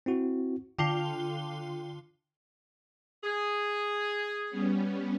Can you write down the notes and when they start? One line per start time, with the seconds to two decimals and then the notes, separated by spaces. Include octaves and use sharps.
0.06 C4 E4 F#4
0.79 D3 F4 G5 G7
3.24 G#4
4.50 G3 B3 C#4